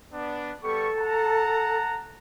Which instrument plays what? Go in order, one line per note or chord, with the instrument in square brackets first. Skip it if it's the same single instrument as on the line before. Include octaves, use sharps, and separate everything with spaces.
[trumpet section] B3 D4
[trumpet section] G3 B3 C#6 [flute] A4
[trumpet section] F#5 A5 A#5